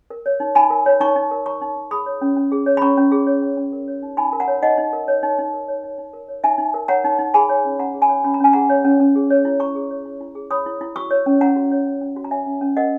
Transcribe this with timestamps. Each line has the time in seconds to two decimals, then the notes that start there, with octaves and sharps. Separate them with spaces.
0.10 A#4
0.26 C#5
0.40 D#4
0.55 D#4 G#5 B5
0.70 A#4
0.86 C#5
1.00 D#4 A#5 C#6
1.16 D#4
1.31 A#4
1.46 C#5 A#5 C#6
1.61 D#4
1.76 D#4
1.91 G#4 B5 D#6
2.06 C#5
2.21 C#4
2.36 C#4
2.52 G#4
2.66 C#5
2.77 B5
2.82 C#4 A#5 C#6
2.97 C#4
3.12 G#4
3.27 C#5
3.42 C#4
3.57 C#4
3.73 A#4
3.88 C#5
4.02 D#4
4.17 D#4 G#5 B5
4.32 A#4
4.40 F#5 A#5
4.48 C#5
4.63 D#4 D#5 F#5
4.78 D#4
4.93 A#4
5.08 C#5
5.23 D#4
5.38 D#4
5.54 A#4
5.68 C#5
5.83 D#4
5.98 D#4
6.13 A#4
6.28 C#5
6.44 D#4 E5 G#5
6.58 D#4
6.74 A#4
6.88 C#5 F#5 A#5
7.04 D#4
7.19 D#4
7.34 G#4 G#5 B5
7.49 C#5
7.65 C#4
7.79 C#4 F#5 A#5
7.94 G#4
8.02 G#5 B5
8.09 C#5
8.24 C#4 B5
8.34 A#5
8.40 C#4 G#5
8.53 G#4 F#5 A#5
8.70 C#5
8.85 C#4
9.00 C#4
9.15 G#4
9.30 C#5
9.45 E4
9.60 E4 A#5 C#6
9.75 G#4
9.90 C#5
10.05 E4
10.21 E4
10.35 G#4
10.51 C#5 B5 D#6
10.66 E4
10.81 E4
10.96 F#4 C#6 E6
11.11 C#5
11.26 C#4
11.41 C#4 F#5 A#5
11.56 F#4
11.71 C#5
11.87 C#4
12.01 C#4
12.16 F#4
12.24 A#5
12.31 C#5 E5 G#5
12.46 C#4
12.61 C#4
12.77 A#4 D#5 F#5